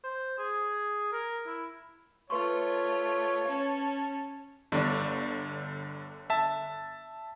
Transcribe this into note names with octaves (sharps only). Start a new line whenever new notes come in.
C5
G#4
A#4
E4
A3 F4 B4 C#5 C6 C#6
C#4 A5
G1 G2 D3 D5
E5 A5